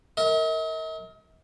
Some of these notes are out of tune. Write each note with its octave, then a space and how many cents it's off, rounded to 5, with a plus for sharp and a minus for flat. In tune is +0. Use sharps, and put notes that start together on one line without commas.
A#4 -20 D#5 +45